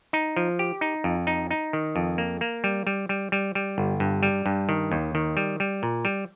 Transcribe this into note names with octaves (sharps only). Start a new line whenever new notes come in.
D#4
F3
G4
D#4
F2
D#4
D#4
D#3
F2
A#3
A#3
G3
G3
G3
G3
G3
G1
G2
G3
G2
D#3
D#2
D#3
G3
G3
A#2
G3